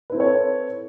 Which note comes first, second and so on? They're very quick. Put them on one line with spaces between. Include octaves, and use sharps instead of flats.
B4 E4 C4 A4 C#5